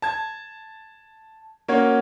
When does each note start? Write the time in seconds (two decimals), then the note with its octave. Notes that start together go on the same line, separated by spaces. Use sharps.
0.02 A5 G#6
1.68 A#3 C#4 F#4 C#5